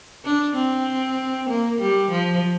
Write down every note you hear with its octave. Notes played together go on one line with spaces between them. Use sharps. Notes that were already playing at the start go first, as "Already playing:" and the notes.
D4
C4
A#3
G3
F3